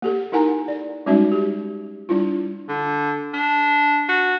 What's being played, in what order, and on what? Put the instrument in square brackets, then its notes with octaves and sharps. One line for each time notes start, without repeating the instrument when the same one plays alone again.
[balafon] A#3 G4 A4
D#4 E4 A#4 F#5 G#5 A#5
D5
G3 G#3 C#4 D#4 F#4 E5
G4
G3 D4 E4 F4
[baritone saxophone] D3
D4
F#4